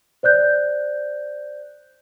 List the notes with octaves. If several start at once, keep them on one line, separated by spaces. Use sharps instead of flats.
C5 D5 F#6 G6